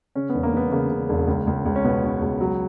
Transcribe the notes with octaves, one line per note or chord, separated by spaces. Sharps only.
C#3 C#4
E1 B3
A#3
E1 B3
C#3 A#3
C#3
E1
C#2
C#2
C#2
C#4
B2 B3
B2
C#2
F#3